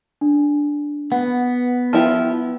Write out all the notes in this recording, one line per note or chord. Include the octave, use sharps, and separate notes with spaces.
D4
B3 F#5
F3 E4 G4